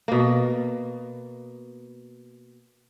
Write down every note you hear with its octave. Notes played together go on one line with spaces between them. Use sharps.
B2 A#3